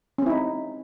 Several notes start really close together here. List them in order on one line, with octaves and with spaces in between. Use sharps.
C#4 C4 E4 D#4